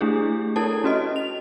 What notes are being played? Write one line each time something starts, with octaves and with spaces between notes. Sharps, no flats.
A3 D4 E4 G4 G#4
E4 A4 A#4 C#5 A5
C#4 F#4 D#5
F7